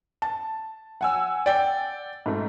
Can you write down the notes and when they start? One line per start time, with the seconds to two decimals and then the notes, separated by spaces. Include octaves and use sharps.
0.22 A5
1.01 F#5 G#5 E6
1.46 D5 G5
2.26 G#2 A3